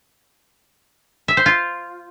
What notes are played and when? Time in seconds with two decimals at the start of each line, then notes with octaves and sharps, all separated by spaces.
1.28 E5
1.37 C5
1.46 F4